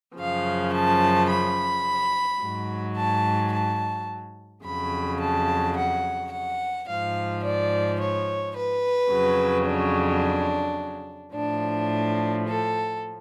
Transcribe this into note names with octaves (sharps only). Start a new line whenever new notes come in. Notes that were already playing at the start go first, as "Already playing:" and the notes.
F#2 C#3 F3 F5
A5
B5
G#2 F#3
A5
A5
F2 C#3 F#3 B5
A5
F#5
F#5
G#2 F3 F5
D5
C#5
B4
F2 C#3 F#3
D4
A2 F3 D4
A4